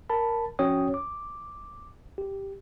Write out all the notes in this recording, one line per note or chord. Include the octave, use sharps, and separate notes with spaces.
A#4 A5 B5
F3 C#4 F#4 C#5 G5 D#6
D6
G4